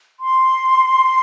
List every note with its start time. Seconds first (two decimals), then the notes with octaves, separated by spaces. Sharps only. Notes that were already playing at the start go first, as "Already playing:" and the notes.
0.20 C6